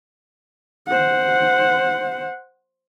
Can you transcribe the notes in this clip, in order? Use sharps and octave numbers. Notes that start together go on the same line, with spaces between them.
C5 F#5